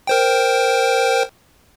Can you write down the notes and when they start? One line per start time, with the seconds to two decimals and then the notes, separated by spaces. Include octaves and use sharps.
0.07 A#4 C5 G5